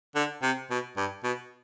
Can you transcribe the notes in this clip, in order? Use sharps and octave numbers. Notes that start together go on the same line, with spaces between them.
D3
C3
B2
G2
B2